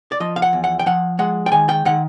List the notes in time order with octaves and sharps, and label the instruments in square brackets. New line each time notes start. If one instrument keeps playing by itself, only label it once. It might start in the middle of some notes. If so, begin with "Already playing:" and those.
[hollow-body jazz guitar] D5
F3 D#5
F5
F#5
E2
F#5
G5
F3 F#5
G#3 F#5
G5
D#3 G#5
G5
D#3 F#5